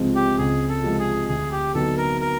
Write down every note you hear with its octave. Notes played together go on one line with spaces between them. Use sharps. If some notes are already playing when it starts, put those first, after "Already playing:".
Already playing: C#2 C3 F3 G#3 C4
G4
C#2 G#4
A4
C3 F3 G#3 C4
G#4
D2 G#4
G4
D3 F#3 B3 D#4 A4
A#4
A#4